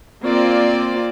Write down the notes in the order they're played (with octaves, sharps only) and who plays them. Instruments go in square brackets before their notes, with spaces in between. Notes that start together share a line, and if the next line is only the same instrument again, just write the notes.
[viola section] A#3 C4 F4 D5